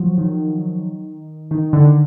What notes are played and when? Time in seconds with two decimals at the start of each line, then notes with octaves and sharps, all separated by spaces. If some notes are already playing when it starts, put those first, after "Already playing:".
Already playing: F3 F#3
0.18 D#3
1.51 D#3
1.73 D3